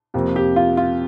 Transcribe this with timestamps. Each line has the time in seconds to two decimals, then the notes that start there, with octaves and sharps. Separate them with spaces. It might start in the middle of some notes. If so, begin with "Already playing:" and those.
0.14 F2 C3 F3 A#3
0.36 G4
0.56 F4
0.77 F4